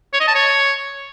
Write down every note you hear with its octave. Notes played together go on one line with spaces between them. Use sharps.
C#5
D#5
A5
C#5